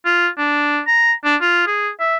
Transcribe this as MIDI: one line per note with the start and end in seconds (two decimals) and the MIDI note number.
0.05 0.28 65
0.38 0.80 62
0.87 1.13 82
1.25 1.36 62
1.41 1.67 65
1.67 1.90 68
2.00 2.17 76